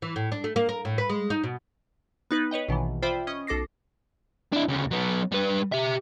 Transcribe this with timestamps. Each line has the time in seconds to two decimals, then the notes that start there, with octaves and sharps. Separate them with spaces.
0.02 E3
0.16 A2
0.32 D4
0.44 A3
0.56 A#3
0.69 A#4
0.85 A2
0.98 B4
1.09 G#3
1.30 D#4
1.43 B2
2.31 B3 D#4 B4 F#6
2.51 B4 C#5 D#5 G5
2.69 A#1 B2 D#3 E3
3.02 F4 C5 D5 E5 G5 B5
3.27 C#4 D#5 C#6 D#6
3.47 B1 A4 D6 A#6 C7
4.53 D4 E4
4.68 D2 C#3
4.91 F#3 B3
5.32 G3 B4
5.72 G4 E5